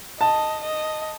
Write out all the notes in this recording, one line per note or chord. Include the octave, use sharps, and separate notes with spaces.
D#5 A5
D#5